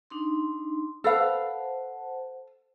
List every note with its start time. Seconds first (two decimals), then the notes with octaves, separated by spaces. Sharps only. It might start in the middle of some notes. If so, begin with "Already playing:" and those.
0.10 D4 D#4 C6
1.04 A4 B4 C5 F5 F#5 A5